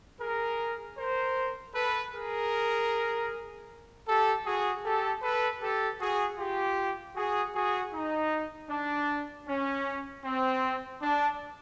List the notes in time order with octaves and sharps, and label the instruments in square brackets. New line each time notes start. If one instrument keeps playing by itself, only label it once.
[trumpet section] G#4 A#4
A#4 C5
A4 B4
G#4 A#4
G4 A4
F#4 G#4
G4 A4
A4 B4
G4 A4
F#4 G#4
F4 G4
F#4 G#4
F#4 G#4
D#4
D4
C#4
C4
D4